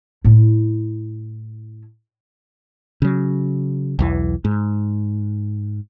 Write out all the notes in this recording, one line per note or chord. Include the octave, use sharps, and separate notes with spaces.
A2 E4
C#3 F#3
B1 E2 E3
G#2